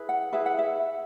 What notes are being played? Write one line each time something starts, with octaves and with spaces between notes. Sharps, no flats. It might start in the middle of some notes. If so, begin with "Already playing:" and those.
Already playing: E4 G#4 B4
F#5
E4 G#4 B4 E5
F#5
E5